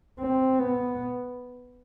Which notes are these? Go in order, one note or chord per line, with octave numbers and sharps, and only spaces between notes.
C4
B3